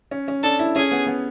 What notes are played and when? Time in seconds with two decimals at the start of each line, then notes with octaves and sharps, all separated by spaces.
0.11 C#4
0.28 C#4
0.43 D4 A4
0.59 E4
0.75 C#4 G#4
0.92 B3
1.07 B3